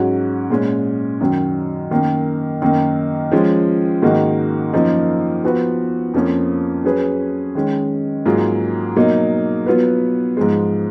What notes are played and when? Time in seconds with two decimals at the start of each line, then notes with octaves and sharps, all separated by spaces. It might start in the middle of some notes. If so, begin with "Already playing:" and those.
Already playing: G#2 F#3 C#4 F#4
0.50 A#2 G#3 C#4
1.21 F#2 D#3 F#3
1.91 F#2 D#3 A#3
2.62 F#2 D#3 A#3 D#4
3.31 F3 G#3 C#4 F4
4.02 G#2 D#3 A#3 D#4 F#4
4.73 F#2 F3 A#3 D#4
5.44 F3 B3 F#4 B4
6.14 F2 F3 A#3 C#4
6.84 F#3 C#4 G#4 B4
7.55 D#3 G#3 C#4
8.26 G#2 F#3 A#3 F4 G#4
8.96 B2 F#3 A#3 D#4
9.66 F#3 B3 F4 B4
10.37 G#2 F3 G#3